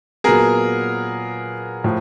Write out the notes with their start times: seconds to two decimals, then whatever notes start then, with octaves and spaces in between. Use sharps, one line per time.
0.24 A#2 F#3 B3 G#4 A#4
1.84 A2 F3